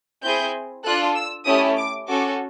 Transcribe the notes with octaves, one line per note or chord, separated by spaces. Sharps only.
C4 E4 G#4 G6
D4 F4 A4 F#6
E6
A3 C#4 E4 G4 D#6
D6
C#4 F#4 A4 D6